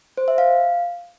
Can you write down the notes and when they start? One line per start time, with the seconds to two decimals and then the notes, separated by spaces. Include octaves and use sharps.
0.18 C5
0.28 E5
0.38 F5